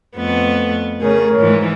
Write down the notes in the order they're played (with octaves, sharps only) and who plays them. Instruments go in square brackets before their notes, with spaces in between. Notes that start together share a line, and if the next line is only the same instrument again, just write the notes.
[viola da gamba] F2 A3 B3
[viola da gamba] C#3 A3 G#4 [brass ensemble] A#4 C#5
[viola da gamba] G#2 E3 F3